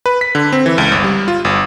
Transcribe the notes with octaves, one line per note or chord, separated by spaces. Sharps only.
B4
B6
D3
C4
E3
C#2
G1
G3
F4
G1